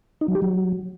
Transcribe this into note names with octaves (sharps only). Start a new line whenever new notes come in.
D#4
F#3
G4
F#3